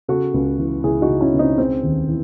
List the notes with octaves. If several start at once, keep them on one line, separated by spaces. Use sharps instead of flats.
C#3 F#4 A4
C#2
E3
C#2 E4 G#4
D#4 F#4
C#3
C#4 E4
C#2
C4 D#4
C#3 C4
D#2
E3